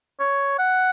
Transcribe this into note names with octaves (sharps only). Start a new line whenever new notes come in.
C#5
F#5